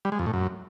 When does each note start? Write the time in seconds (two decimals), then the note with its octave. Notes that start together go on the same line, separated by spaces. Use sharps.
0.05 G3
0.12 G#3
0.19 F2
0.26 A2
0.33 F#2